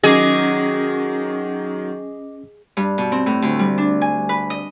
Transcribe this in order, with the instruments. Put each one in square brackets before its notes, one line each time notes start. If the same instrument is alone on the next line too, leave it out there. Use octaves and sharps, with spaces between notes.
[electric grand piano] D#3 F#3 [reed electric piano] C#4 [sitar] G#4 [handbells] D#5 D6
[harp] G2
B2
C4
A2
D2
G3
D4
G#5
B4
D#5